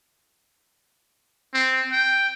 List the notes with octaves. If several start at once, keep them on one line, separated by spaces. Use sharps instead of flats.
C4
G5